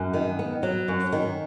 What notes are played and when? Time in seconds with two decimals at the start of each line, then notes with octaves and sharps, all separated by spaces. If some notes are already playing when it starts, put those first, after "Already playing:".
Already playing: F#2
0.14 D#3
0.39 B3
0.63 F#3
0.88 F#2
1.12 D#3